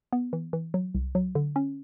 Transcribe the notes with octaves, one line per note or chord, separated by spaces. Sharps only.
B3
E3
E3
F#3
C2
F#3
D3
C#4